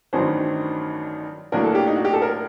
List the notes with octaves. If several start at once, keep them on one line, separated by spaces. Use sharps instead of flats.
A1 G2 D#3 F#3 C5
A2 F#3 A#3 D4 A#4
A4
G4
D#4
F#4
G4
A4
A#4